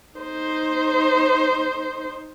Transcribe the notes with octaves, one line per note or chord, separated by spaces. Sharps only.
D#4 C5